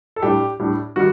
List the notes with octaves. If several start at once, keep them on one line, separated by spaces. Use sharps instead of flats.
A4
A2 G3 D4 G4
A2 G3 D4
D#3 G3 F#4